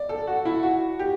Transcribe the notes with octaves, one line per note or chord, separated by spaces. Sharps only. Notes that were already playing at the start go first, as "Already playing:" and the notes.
Already playing: D5
A4
F#4
E4
F#4
G4